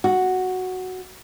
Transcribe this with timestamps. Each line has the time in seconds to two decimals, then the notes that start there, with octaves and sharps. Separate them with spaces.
0.04 F#4